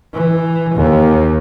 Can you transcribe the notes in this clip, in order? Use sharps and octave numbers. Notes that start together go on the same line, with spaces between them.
E3
D#2